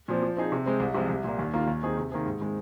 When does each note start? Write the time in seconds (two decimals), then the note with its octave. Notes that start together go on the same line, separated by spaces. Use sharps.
0.08 A#2 F3 C4
0.22 F3
0.37 C4 D#4 G#4
0.52 C3
0.66 G#3 C4
0.80 C2
0.94 C3 F3 G#3 F4
1.09 C2
1.24 A#2 A#3
1.39 D#2
1.54 D#3 A#3 F4
1.67 D#2
1.83 D#3 C4 D#4 G#4
1.97 C3
2.12 D#3 A#3 G#4 C5
2.26 G#2
2.40 D#3 G#3 C4